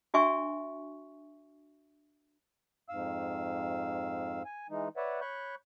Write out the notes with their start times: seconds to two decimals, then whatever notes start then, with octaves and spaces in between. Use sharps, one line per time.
0.14 D4 F#4 E5 G#5 C#6
2.89 F2 G#2 F5 E6
4.45 G#5
4.70 E3 G#3 D#4
4.97 B4 C#5 D5 E5 F#5
5.21 C#5 B5 C#6 F#6 G6